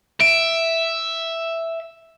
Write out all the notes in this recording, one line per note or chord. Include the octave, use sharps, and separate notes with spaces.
E5 D7